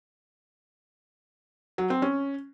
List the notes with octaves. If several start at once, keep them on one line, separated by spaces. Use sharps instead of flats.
F#3
C4
C#4